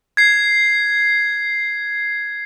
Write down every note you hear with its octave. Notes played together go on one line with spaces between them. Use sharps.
G#6 C7